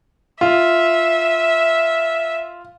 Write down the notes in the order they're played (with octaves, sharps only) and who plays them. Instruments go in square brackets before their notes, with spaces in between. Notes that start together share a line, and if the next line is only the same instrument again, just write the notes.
[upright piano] F4 [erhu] E5